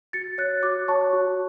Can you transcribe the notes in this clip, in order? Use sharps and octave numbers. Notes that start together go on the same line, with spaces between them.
F#4 A6 C#7
C#5 F#6 A6
F#4 D6 F#6
C#5 A5 C#6
F#4